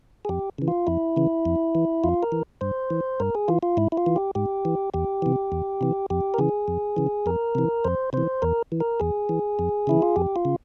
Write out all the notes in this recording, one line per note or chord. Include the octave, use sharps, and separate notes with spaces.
G#4
F2 G4
C#3 E3
F4
F2 E4
C#3 E3
F2
E3
F2 F4
A#4
E3
G2 C5
E3
G2 A#4
G#4
E3 F4
F4
G#2 E4
E4
F4
E3
G4
G#2 G4
E3
E2 G4
C3 E3
E2
C3 E3
F2 G4
A#4
C#3 E3 G#4
F2
C#3 E3
F2 A#4
C3 E3
F2 C5
C3 E3 C5
E2 A#4
E3
A#4
E2 G#4
E3
F2
C#3 E3 E4
F4
F2 G4
F4
C#3